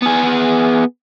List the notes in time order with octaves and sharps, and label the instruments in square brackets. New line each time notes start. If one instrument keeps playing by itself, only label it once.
[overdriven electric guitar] B3 G#4